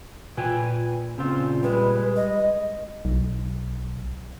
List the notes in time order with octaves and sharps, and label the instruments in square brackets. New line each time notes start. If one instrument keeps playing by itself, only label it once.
[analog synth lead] A#2 [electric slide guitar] B4 G5 G#5
[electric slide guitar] C#3 C4 F4
[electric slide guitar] G3 G#3 [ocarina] B4
[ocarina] D#5
[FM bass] B1